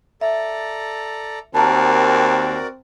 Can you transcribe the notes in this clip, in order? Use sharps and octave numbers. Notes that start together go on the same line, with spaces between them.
A4 D5 E5 A#5
D#2 C4 F#4 A#4 D5 A5 A#5